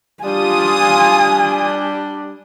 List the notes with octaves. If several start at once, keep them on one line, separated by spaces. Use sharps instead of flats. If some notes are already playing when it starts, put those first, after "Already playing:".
G3 D4 F4 G#5 D#6